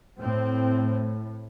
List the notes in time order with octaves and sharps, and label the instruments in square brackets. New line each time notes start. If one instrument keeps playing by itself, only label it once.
[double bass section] A2 C4